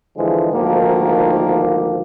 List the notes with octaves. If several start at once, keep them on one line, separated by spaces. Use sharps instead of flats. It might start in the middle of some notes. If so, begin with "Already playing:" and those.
D3 E3 F3 G#3
D2 G#2 D#3 F3 A#3